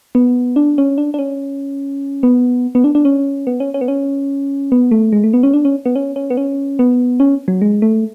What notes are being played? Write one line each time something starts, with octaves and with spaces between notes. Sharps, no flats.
B3
D4
C#4
D4
D4
C#4
B3
B3
D4
D4
C#4
B3
C#4
C#4
B3
C#4
B3
A3
G#3
A3
B3
C#4
D4
C#4
B3
C#4
C#4
B3
C#4
B3
C#4
F#3
G#3
A3